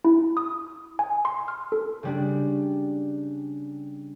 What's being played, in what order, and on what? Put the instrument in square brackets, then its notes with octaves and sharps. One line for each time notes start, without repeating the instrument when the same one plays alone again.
[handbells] E4
D#6
G#5
C6
F6
A4
[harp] C#3 G3 D4